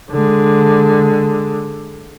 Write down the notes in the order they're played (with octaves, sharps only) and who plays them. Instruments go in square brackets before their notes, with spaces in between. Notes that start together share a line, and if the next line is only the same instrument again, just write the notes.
[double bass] D3 G#3